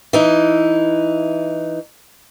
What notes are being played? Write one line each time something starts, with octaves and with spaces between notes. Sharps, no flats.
E3 D#4